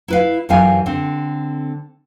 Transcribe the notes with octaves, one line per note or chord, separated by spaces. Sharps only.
E4 B4 F5
F#2 E3 G4 F5 G#5
D3 C4